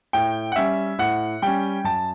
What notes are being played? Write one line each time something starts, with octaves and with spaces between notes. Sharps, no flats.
A2 G5
F#5
G3 C#4 E5
A2 F#5
G3 C#4 G5
F#2 A5